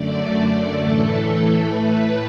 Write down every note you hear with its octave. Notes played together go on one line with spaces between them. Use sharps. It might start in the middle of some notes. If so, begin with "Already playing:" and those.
Already playing: F#2 D3 A3 D5
A2 E3 A3 A4
A2 A3 B4